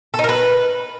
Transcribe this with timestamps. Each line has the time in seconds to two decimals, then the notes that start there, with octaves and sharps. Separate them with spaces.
0.14 A4
0.19 D#4
0.24 A#4
0.29 B4